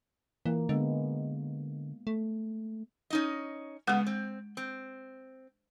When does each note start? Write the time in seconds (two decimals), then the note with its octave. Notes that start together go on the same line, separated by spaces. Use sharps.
0.46 E3 A#3
0.69 D3 G#3 B3
2.07 A3
3.10 C#4 D#4 D#5
3.87 C#3 G#3 B3 F#5
4.07 C4
4.57 C4